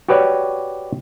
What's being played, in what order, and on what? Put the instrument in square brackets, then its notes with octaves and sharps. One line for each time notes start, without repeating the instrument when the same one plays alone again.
[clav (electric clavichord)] F#4 G4 B4 C#5 D5